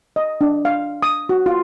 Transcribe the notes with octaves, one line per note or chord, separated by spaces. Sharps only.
D#5
D4
F5
D#6
F#4
F4